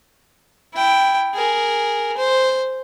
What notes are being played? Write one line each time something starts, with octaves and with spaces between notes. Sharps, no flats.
E4 G5
G#4 A#4
C5